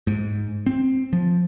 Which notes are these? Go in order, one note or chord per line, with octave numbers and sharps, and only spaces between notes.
G#2
C4
F3